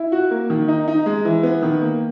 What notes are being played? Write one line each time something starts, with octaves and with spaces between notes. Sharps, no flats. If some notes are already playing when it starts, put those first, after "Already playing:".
Already playing: E4
F#4
A#3
D#3
D#4
D#4
G#3
E3
B3
D#3
A#3